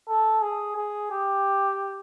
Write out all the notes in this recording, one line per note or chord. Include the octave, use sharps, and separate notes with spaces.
A4
G#4
G#4
G4